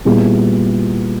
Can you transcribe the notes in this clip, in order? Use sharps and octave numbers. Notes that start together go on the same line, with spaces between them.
A#2 G3 B3 E4 G#4